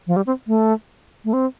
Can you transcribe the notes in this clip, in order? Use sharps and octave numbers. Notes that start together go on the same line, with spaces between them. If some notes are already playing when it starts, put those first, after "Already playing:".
F3
G3
C4
A3
A3
C4